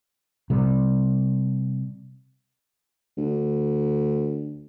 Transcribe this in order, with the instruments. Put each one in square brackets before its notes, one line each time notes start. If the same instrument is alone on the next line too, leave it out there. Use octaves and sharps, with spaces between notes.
[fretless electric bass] C3 G3
[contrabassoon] D2